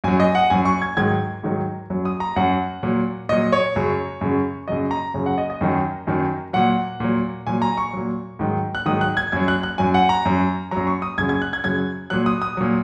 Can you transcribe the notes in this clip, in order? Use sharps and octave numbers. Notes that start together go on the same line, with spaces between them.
F#2 F#3 G#5
D#5
F#5
F#2 F#3 G#5
C#6
G#6
G#2 D#3 F#3 G#6
G#2 D#3 F#3
F#2 F#3
D#6
A#5
F#2 F#3 F#5
A#2 F#3
A#2 F#3 D#5
C#5
F#2 C#3 F#3
F#2 C#3 F#3
F#2 C#3 F#3 D#5
A#5
F#2 C#3 F#3
F#5
D#5
D#5
F#2 D#3 F#3
F#2 D#3 F#3
A#2 F#3 F#5
A#2 F#3
A#2 F#3 G#5
A#5
C#6
A#2 F#3
G#2 D#3 F#3
F#6
G#2 D#3 F#3 D#6
F#6
G#6
F#2 F#3 G#6
F#6
F#6
F#2 F#3 G#5
F#5
A#5
F#2 F#3
F#2 F#3 A#5
C#6
D#6
F#2 C#3 F#3 G#6
G#6
F#6
G#6
F#2 C#3 F#3 G#6
A#2 F#3 F#6
D#6
D#6
A#2 F#3